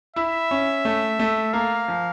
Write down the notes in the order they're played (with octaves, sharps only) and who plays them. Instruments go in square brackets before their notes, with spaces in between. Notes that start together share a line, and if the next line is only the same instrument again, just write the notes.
[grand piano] E4 [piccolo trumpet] E5
[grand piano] C#4
A3
A3
[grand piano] A#3 [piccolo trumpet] F5
[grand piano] F3